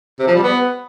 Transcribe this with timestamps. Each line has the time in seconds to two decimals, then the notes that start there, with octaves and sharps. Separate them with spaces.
0.19 C3
0.27 F3
0.35 G3
0.43 B3